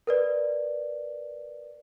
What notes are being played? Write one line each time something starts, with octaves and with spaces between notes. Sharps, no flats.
A#4 B4 D5